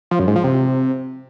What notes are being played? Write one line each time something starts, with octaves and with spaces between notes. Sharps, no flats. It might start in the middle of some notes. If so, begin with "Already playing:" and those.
F3
F#2
G#2
F3
C3